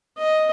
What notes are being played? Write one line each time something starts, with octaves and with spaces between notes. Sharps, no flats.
D#5